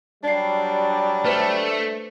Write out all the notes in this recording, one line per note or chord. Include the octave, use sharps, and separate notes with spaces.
F#3 G3 D4 D5 C7
A3 B4 C5 F6